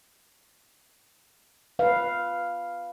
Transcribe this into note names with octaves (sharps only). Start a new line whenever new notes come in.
B4 F5